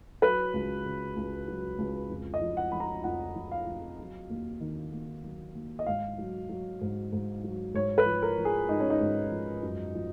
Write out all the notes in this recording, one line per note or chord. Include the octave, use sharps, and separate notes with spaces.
F#3 B4
C#2
C#3
C#2
F#3
C#2
F2
D#5
F3
F#5
F3 B5
A#5
F2 F#5
F2
F5
F3
F#3
D#2
D#3
D#2
F#3
D#2
D#5
G#2 F5
F#3
F#3
G#2
G#2
F#3
G#2 C#5
B4
F3
A#4
F3
G#4
G#2 D#4
C#4
D#4
G#2
F3
F#2
F3